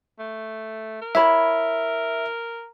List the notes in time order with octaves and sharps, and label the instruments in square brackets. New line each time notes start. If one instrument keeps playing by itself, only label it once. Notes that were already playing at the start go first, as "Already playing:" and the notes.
[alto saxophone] A3
A#4
[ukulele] E4 C#5 B5 [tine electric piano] E5